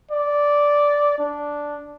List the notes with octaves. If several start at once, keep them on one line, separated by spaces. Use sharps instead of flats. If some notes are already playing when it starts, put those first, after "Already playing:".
D5
D4